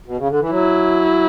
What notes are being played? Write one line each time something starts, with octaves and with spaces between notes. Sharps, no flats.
B2
C#3
D3
E3
F#3 E4